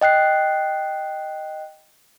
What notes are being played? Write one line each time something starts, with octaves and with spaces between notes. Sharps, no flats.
D#5 G5 F#6 C7